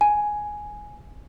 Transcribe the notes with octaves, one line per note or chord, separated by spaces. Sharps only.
G#5